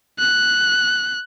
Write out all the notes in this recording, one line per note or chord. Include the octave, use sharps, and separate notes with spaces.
F#6